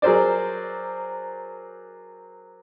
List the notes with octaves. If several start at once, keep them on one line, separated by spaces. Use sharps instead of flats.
F#3 G#4 A#4 C5 D5